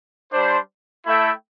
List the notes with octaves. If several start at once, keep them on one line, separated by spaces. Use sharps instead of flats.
G3 D4 C5
A3 E4 A4 E5 G5